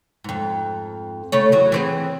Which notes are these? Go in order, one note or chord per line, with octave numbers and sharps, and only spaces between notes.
F2 G#2
C#3 A3 C#5
E2 F#3
E3 C4 G#4